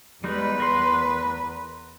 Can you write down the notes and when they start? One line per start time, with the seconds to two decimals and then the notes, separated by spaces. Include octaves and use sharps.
0.24 E2 G3 G#3 D#4 B4
0.60 A#4 C6